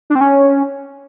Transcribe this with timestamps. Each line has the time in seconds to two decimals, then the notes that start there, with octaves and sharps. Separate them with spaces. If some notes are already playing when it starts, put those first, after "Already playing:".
0.10 D4
0.15 C4
0.21 C#4